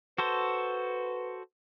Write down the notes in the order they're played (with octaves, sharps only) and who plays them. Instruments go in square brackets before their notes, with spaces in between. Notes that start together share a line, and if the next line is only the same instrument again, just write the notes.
[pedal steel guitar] F#4 A4 C5 [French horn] B4